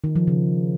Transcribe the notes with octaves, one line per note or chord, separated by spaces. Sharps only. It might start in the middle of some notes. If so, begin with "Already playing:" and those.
D#3
F3
C#3